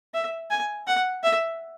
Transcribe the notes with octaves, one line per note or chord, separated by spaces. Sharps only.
E5
G#5
F#5
E5